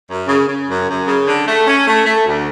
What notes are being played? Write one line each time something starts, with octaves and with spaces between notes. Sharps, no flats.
F#2
C#3
C#3
F#2
F#2
C#3
D3
A3
C#4
A3
A3
D2